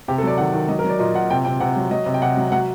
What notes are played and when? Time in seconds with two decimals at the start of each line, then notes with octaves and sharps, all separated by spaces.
0.08 C3 G4
0.18 A4
0.23 F#3 D5
0.38 D#3 F#5
0.54 D#3
0.69 F#3 D#5
0.79 A#4
0.84 F#3
0.90 D5
0.99 A#2 D#5
1.14 A#2 F#5
1.30 C3 G5
1.45 C3 G5
1.60 C3 F#5
1.76 F#3
1.91 F#3 D#5
2.06 C3
2.14 G5
2.22 C3 F#5
2.37 F#3
2.52 F#3 F#5